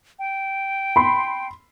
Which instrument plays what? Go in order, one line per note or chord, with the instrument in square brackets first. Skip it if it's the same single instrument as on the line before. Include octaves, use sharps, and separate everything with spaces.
[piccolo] G5
[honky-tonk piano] B5 C6